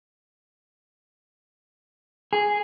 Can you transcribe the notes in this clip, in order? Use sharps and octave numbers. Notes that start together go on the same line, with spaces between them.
G#4